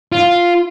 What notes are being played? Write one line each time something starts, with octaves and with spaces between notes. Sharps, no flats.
F4